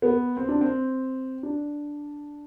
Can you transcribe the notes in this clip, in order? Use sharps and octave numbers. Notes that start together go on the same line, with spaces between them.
B3
C4
D4
C4
D4